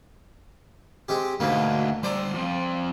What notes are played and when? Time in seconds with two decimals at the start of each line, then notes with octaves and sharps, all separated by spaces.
1.08 G#3 C4 G4
1.40 D2 G#2 B2 A#3
2.03 G3 C5 D5 A#5
2.35 F3 C4